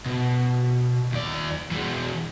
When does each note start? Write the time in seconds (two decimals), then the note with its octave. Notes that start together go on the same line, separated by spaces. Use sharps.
0.06 B2
1.12 D#2 D5
1.71 E3 G#3